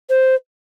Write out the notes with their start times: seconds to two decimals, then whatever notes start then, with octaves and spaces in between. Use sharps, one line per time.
0.10 C5